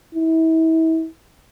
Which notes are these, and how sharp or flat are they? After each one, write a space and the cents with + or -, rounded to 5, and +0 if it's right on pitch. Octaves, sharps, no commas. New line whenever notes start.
E4 -35